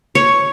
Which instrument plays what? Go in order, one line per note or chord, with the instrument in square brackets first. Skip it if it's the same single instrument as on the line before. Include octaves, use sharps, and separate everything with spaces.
[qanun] C#5